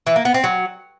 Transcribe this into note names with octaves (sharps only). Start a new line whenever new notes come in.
E3
A#3
B3
C4
F#3